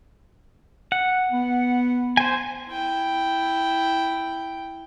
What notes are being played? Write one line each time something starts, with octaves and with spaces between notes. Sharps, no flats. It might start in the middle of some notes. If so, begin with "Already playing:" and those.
F#5
B3
C5 G#5
E4 G5